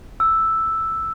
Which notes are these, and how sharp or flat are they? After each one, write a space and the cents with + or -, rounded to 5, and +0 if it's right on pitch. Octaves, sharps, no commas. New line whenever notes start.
E6 +0